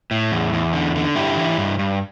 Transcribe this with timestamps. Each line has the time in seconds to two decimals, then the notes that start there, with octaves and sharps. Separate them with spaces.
0.11 A2
0.32 E2
0.53 E2
0.73 D3
0.95 D3
1.16 G2 E4 G4
1.37 E3
1.57 G2
1.79 G2